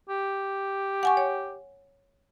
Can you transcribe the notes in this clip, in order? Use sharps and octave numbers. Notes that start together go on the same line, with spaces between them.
G4
F#5 G#5 C#6
C#5